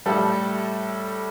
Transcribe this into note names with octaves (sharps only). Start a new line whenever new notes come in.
A2 G3 A4